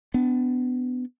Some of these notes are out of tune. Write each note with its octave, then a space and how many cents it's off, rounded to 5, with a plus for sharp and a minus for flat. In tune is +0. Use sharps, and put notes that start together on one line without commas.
B3 +25 D4 +0